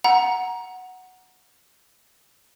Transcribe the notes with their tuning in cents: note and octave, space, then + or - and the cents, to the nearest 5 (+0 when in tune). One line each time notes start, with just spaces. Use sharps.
F#5 +0 A#5 +15